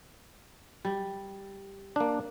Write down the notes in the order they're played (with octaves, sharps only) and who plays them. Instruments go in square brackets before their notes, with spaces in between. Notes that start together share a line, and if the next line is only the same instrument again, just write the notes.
[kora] G3
[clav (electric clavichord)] A#3 D4